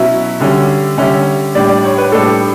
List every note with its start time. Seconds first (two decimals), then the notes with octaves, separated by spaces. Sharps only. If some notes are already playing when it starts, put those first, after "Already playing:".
Already playing: B2 F#3 C#4 E4 E5
0.40 D3 G3 C#4
0.98 D3 G3 C#4 E5
1.55 A2 G3 D4 D5
1.69 D5
1.84 C#5
1.98 B4
2.12 A2 G3 D4 A4